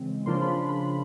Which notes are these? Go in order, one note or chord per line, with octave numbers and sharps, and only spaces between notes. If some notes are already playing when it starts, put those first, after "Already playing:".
Already playing: C#3 E3 G#3 C4
C#3 F3 A#3 D4 F4 C6
B5
C6
B5